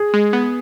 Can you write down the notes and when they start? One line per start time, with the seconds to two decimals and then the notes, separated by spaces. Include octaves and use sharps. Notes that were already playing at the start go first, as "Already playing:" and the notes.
Already playing: G#4
0.14 G#3
0.33 B3